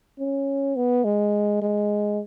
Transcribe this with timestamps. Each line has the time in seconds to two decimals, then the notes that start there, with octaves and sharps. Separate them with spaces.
0.19 C#4
0.76 B3
1.04 G#3
1.62 G#3